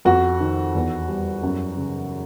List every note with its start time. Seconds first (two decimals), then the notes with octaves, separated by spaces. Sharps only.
0.05 F2 F#4
0.40 D#3
0.75 E2
1.08 G3
1.43 F#2
1.77 C#3